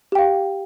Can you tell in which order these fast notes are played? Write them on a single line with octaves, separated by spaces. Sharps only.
G4 G5 F5